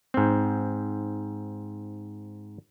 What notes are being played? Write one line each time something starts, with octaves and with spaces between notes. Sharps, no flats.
G#2 C4